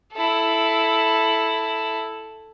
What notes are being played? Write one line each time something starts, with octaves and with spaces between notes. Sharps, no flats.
E4 A4